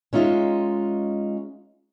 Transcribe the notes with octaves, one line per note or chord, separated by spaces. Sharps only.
G#3 C#4 D#4 F4 E5